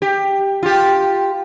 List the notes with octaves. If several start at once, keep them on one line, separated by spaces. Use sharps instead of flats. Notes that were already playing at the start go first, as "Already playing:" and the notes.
G4
F4 G4